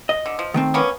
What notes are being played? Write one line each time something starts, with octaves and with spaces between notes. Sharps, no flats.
D#5
D3
F3
D#3 A3 C4
A#3 B3 C#4